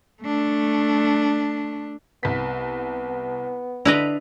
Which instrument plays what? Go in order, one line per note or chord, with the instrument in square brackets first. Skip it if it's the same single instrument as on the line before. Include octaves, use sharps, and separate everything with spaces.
[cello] A3 D4
[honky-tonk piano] C2 B6 [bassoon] B3
[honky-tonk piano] D3 F7 [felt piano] D4 [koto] E4 B4 D#5